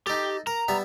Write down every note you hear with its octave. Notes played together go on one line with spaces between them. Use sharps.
D#4 G4 A4
A#4 A#5
G3 B3 E5